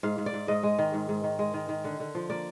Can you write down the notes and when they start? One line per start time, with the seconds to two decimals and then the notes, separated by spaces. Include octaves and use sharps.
0.03 G#2 F5
0.18 G#2
0.26 D5
0.34 G#2
0.48 G#2 D#5
0.63 G#3
0.78 D#3
0.94 G#2
1.09 G#2
1.24 D#3
1.39 G#3
1.54 D#3
1.69 D#3
1.84 D3
2.00 D3
2.15 F3
2.30 A#3 D5